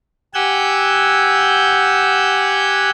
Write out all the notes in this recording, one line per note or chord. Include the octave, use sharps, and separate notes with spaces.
G4 F#5 G#5 E6 G6